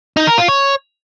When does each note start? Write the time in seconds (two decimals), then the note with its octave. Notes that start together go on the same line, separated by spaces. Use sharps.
0.17 D#4
0.27 A#4
0.38 F4
0.48 C#5